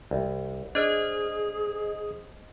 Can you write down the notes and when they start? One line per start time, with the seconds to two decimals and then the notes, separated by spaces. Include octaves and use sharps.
0.11 C2
0.75 D4 G#4 C5 D#5